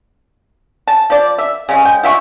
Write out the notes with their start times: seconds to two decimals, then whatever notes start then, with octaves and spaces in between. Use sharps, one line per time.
0.87 A5
1.10 F3 D5
1.38 E5
1.69 C#3 G#3 C#4
1.82 G#3 G5
2.03 F4 E5 G5 C#6